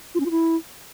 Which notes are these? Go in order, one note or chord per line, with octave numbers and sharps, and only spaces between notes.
F4
C#4
F4
E4